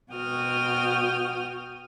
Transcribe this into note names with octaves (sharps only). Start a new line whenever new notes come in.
B2 F#4 G5 D#6 F6